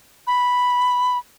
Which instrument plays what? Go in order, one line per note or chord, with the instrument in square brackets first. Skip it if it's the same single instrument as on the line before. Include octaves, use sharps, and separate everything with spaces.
[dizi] B5